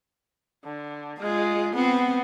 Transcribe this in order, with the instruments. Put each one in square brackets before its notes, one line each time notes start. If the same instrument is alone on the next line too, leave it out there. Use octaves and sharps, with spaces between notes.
[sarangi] D3
[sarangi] G#3 [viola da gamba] F4
[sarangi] B3 [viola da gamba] C4